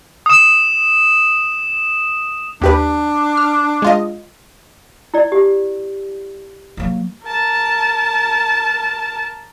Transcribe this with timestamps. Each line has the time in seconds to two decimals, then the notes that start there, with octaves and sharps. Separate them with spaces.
0.26 D#6 E7
2.62 D#2 D4 G4 B4
3.37 F6
3.82 G#3 F4 D#5
5.14 E4 D5
5.32 G4
6.77 F#3 A#3
7.24 A#4 A5